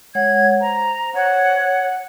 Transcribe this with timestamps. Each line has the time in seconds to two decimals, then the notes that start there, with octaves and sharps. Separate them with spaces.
0.15 G#3 C#5 F#5 G#6
0.61 C5 A#5
1.15 C#5 F#5